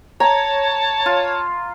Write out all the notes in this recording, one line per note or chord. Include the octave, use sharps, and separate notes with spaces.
C#5 A5 A#5
F4